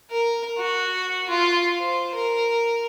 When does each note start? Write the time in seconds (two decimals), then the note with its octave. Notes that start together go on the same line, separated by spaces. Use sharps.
0.10 A#4
0.58 F#4
1.29 F4
1.80 C5
2.15 A#4